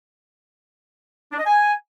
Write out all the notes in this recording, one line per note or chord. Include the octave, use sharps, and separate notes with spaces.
D4
D#5
G#5